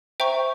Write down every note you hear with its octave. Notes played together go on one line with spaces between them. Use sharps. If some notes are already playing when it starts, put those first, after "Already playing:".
C5 E5 G5 A#5 C#6